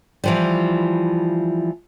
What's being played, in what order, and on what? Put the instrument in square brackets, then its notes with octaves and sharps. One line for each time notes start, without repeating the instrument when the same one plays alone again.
[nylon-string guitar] E3 F3 G3